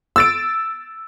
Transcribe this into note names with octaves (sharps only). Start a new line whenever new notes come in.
E6 A6 D7